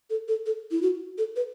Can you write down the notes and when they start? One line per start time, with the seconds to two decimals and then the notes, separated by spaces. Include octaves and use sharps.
0.10 A4
0.28 A4
0.46 A4
0.71 E4
0.82 F#4
1.18 A4
1.36 B4